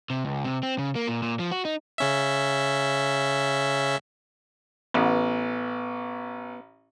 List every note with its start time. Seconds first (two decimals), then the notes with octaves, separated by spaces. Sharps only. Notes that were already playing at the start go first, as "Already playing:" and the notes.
0.10 C3
0.25 C#2
0.45 C3
0.63 C4
0.79 C#3
0.95 A#3
1.07 A#2
1.23 A#2
1.39 F3
1.52 F#4
1.65 D#4
1.98 C#3 C#4 E5
4.94 A1 B3